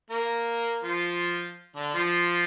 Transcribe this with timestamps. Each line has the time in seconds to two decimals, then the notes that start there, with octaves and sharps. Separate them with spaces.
0.10 A#3 A#4
0.83 F3 F4
1.76 D3 D4
1.94 F3 F4